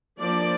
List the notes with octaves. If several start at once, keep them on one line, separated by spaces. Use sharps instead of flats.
F3 A#3 D4 D5